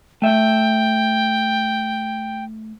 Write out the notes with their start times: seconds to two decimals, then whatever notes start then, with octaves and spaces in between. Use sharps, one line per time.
0.22 A3 E5 G5